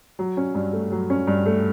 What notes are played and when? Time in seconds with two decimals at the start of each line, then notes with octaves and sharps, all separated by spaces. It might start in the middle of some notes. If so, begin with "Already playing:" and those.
0.19 F#3
0.37 C#4
0.54 G2
0.73 A3
0.92 F#3
1.10 C#4
1.27 G2
1.46 A3